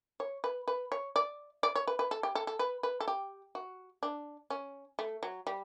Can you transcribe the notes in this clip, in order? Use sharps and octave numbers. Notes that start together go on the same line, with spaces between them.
C#5
B4
B4
C#5
D5
D5
C#5
B4
B4
A4
G4
A4
A4
B4
B4
A4
G4
F#4
D4
C#4
A3
F#3
G3